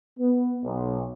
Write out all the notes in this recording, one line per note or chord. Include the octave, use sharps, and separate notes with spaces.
B3
B1